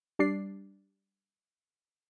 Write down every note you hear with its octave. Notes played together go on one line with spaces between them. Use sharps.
G3 D4 D5 C7